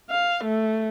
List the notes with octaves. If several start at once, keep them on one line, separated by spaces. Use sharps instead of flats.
F5
A3